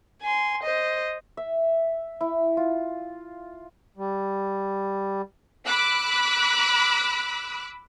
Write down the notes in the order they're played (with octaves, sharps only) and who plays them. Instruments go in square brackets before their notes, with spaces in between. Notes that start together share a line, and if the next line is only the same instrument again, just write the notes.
[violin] G#5 C6
C5 D#5
[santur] E5
E4
F4
[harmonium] G3
[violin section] B5 D6 E6 F#6